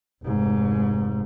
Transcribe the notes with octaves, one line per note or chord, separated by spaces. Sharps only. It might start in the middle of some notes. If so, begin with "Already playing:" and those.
F1 G#2